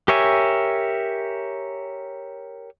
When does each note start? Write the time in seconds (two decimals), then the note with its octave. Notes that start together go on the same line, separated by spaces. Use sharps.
0.08 G4 A#4 C#5 E5 G#5